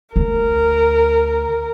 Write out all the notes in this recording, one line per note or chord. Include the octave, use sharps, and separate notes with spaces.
D2 A#4